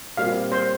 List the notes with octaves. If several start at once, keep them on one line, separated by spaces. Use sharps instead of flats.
A#2 G3 C4 G4 A#4 F5
C5